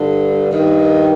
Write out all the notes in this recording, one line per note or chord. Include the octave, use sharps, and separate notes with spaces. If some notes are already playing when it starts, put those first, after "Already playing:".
Already playing: G2 D3
G2 D#3